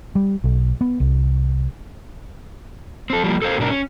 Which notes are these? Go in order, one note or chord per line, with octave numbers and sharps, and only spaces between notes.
G3
B1
B3
C2
C4 A4
F3 G3 A3 A#3
A4 A#4 C5 F5
G#2 B2 D4 A#4
C#4